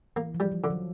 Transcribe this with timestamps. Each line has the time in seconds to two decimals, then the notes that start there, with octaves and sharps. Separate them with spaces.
0.16 E3 A#3
0.35 F3
0.40 G3
0.52 F3
0.64 D3
0.70 F#3